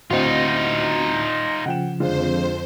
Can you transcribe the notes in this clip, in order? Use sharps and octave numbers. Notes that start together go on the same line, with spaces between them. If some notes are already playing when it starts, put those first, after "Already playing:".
D2 A2 C4 D#4 F4 F#4 D#5
C#3 F3 F#5 G5 E7
F2 D3 G#3 F4 C5